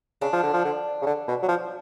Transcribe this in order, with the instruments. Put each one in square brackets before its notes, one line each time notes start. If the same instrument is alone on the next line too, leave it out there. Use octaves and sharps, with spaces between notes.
[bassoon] C#3 [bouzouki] D4
[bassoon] F3
D3
F3
D3
C#3
D3
B2
F#3
F3